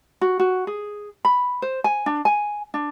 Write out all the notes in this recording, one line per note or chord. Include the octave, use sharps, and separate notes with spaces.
F#4
F#4
G#4
B5
C5
G#5
D4
G#5
D4